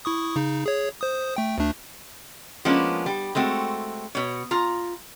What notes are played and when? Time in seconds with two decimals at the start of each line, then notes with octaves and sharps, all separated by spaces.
0.05 E4 C#6 D#6
0.36 C#3 D#4
0.66 G#4 C#5
1.01 C5 D#6
1.36 A3 G5
1.58 D2 A3 D4
2.65 F3 G#3 A#3 B3 C#4 D4
3.06 G3
3.35 G#3 A3 C4 F#4
4.15 B2 C#5
4.51 F4 A#5